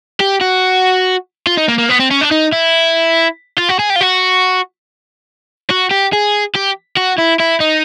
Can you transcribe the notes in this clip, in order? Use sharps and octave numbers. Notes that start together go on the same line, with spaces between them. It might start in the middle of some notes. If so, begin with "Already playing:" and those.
G4
F#4
F4
D#4
A#3
A#3
B3
C4
C#4
D4
D#4
E4
F4
F#4
G#4
G4
F4
F#4
F#4
G4
G#4
G4
F#4
E4
E4
D#4